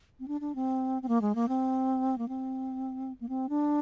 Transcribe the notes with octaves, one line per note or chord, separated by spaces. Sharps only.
C4
D4
D4
C4
C4
A#3
G#3
A#3
C4
A#3
C4
A#3
C4
D4